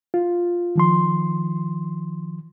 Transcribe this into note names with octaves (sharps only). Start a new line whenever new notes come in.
F4
D#3 F3 C6